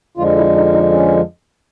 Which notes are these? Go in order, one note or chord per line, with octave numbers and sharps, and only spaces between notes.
F2 D3 F3 G#3 F4
E4
D#4
D#4
C#4